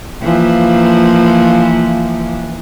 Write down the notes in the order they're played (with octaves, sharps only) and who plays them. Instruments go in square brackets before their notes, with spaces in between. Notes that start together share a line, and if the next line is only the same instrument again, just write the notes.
[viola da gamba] E3 F3 A#3